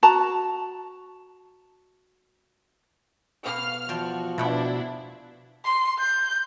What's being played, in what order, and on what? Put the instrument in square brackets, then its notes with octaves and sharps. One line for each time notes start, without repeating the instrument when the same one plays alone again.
[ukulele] F#4 A5 A#5
[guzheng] B2 [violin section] F5 F6
[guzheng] E2 G5 A5 [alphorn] F3 [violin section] F#4
[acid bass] B2 [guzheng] A3 F#5 G5 [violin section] D4 E4
[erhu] C6
G6